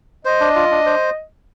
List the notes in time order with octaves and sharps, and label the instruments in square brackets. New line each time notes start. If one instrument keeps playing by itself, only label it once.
[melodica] C5 [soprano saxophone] D#5
[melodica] D4
F4
D4
C5